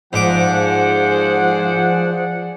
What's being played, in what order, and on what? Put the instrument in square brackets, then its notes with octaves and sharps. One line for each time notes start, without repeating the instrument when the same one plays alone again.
[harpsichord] G#2 D6 [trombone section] F3 [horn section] G#4 D5 F#5 [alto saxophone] C5